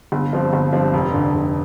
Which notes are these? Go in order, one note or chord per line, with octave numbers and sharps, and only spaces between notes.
G1
G2 F3 C4
G1
G2 F3 C4
F1
F2 D3
F1